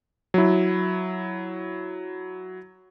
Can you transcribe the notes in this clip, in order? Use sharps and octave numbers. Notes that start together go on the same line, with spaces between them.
F#3 E4